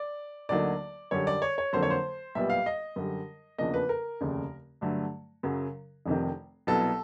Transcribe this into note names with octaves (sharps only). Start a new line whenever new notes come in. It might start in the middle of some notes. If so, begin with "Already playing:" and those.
Already playing: D5
D2 D3 F#3 A#3 D#4 D5
F#2 D3 G3 C#5
D5
C#5
C#5
F2 D3 F#3 A#3 C5
C#5
C5
B1 A#2 G3 B3 E5
F5
D#5
F#2 D3 G3
E2 C#3 F3 A#3 D4 D#5
B4
A#4
F1 D#2 C#3
G2 D3 F#3 A3
F#2 C#3 F#3
F1 F2 C3 D#3
C2 B2 F#3 B3 E4 A4